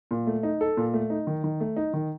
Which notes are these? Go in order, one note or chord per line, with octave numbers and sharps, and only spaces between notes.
A#2
A3
D#4
A4
A#2
A3
D#4
D#3
D#3
A3
D#4
D#3